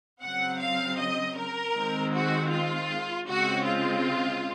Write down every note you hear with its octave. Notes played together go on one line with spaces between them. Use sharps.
C#3 F#3 C4 F#5
F5
D#5
A#4
D#3 G#3 C4
F#4
F4
C#3 G#3 C4 F#4
F4